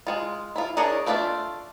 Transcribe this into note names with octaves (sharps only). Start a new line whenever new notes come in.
G#3 F4
E4 F4
D4 G#4 A#4 C#5 D5
A3 D4 F4 D5 E5